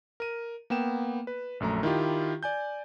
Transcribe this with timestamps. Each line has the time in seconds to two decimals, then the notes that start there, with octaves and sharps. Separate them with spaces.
0.20 A#4 D#7
0.70 A#3 B3 G5 E7
1.27 B4
1.60 A#1 F#2 A3 A#5
1.83 D#3 E4 F4 G4
2.43 D5 G#5 G6